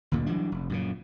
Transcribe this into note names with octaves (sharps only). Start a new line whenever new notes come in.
F#1 D2 A#2 D3
E3 F#3 G3 D4
F1
F#2 A#2 C#3